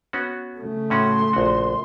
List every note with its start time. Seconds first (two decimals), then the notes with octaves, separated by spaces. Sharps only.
0.13 B3 C#4 F#4
0.57 C#3 A3
0.90 A2 C#4 F#4 C6
1.33 A#1 F#4